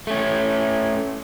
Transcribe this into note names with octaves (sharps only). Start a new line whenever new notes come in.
A3 C#4